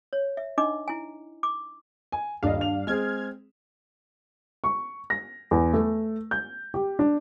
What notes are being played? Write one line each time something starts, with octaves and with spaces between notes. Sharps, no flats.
C#5
E5
D4 D#4 D#5 D6
E4 G#5
D6
G#5
D#1 G2 D4 D#5 F5
F7
G#3 C4 G#4 F6 G#6
C#6
A#6
E2
A3
G6
G4
D4